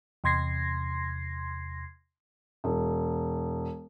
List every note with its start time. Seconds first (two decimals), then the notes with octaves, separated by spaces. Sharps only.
0.24 E2 C3 C6 G#6 A#6 C7
2.64 E1